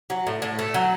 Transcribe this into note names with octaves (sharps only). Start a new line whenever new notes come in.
F#3
A2
A2
A3
F#3